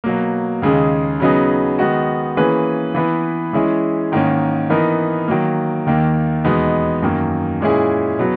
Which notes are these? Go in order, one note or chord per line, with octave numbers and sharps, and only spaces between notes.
B2 F#3 A#3
D#2 C#3 G#3 D#4 G#4
C#3 F#3 B3 D#4 G#4
D#3 G#3 B3 D#4 F#4
E3 A#3 C#4 G#4 B4
E3 B3 E4 B4
E3 G#3 C#4 E4 G#4
G#2 D#3 A#3 C#4
E3 B3 D#4 A#4
D#3 F#3 A#3
D#2 D#3 A#3
E2 B2 G#3 B3 D#4
F#2 D#3 A#3
A#2 G#3 C#4 E4 G#4
B2 F#3 B3